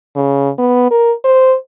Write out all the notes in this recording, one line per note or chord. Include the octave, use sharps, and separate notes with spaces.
C#3
B3
A#4
C5